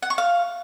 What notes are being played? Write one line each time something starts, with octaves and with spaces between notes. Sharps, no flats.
F#5
C#6
F5